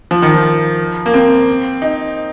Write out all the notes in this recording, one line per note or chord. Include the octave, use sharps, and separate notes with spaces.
F3
D#3
F3
A#3
C4
D#4